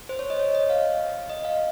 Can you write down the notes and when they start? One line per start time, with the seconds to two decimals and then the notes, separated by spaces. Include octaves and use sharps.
0.09 C5
0.19 C#5
0.30 D#5
0.39 C#5
0.55 D#5
0.70 F5
1.30 D#5
1.45 F5